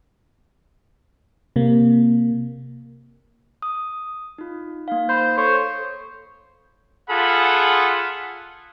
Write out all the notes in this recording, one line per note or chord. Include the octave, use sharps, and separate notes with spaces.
C3 A#3
D#6
D#4 F4
A#3 D#4 F5
C5 F5 B5 G6
A4 C5 C#5
F4 G#4 A4 F#5 B5